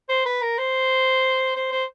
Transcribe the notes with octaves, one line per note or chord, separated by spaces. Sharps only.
C5
B4
A#4
C5
C5
C5